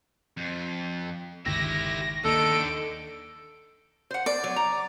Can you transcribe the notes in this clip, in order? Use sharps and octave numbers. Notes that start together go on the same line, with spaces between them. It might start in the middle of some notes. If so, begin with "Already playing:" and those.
F2
G1 C#2 D#3 E4 G4 A#6
D#2 D3 D#4 A4 D7
C5 F#5
D5
F#3
A#5